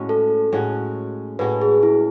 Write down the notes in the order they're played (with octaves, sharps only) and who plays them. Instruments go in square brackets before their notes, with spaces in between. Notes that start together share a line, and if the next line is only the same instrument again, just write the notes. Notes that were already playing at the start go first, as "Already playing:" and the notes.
Already playing: [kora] A2 G#3 C#4 F#4
[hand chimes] A4
[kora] A2 G#3 C#4 F#4
[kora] A2 G#3 C#4 F#4 [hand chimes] B4
[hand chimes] G#4
E4